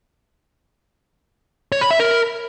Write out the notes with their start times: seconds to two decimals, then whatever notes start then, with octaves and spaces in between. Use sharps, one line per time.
1.72 C#5
1.81 B5
1.91 E5
2.00 A#4